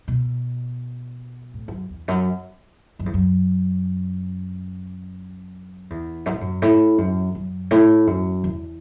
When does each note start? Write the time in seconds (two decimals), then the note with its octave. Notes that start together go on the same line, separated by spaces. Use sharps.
0.08 B2
1.54 A2
1.68 E2
1.71 F#2
1.90 E2
2.08 F#2
2.99 F#2
3.06 E2
3.14 F#2
5.90 E2
6.26 F#2
6.33 A2
6.41 F#2
6.62 A2
6.98 F#2
7.35 F#2
7.71 A2
8.07 F#2
8.44 E2